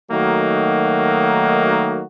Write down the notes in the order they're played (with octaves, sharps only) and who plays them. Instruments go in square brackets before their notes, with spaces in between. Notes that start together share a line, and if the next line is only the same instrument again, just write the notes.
[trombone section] D#3 F#3 A3 A#3 D#4 F#4